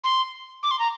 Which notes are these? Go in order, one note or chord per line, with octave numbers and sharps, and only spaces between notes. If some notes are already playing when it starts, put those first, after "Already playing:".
C6
D6
C6
A#5